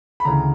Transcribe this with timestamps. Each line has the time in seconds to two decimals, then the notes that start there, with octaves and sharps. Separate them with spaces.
0.20 B5
0.25 D2 C#3 E3 A#5